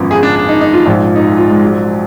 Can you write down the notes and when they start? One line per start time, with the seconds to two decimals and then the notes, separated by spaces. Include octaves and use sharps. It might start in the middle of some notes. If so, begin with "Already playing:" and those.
Already playing: G#1 F#2 F3 B3
0.11 G#4
0.23 D4
0.36 D4
0.49 D#4
0.61 D#4
0.73 F4
0.86 A#1 G#2 F3
1.16 D#4
1.24 F4
1.37 F4
1.50 G#3
1.62 F#3